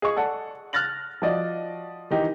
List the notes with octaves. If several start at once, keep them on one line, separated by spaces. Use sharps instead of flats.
G#4 D#5 C#6
A4 D5 F#5
F6 F#6 A6 A#6 F#7
F3 F#4 D5 D#5
D#3 E3 D#4 G4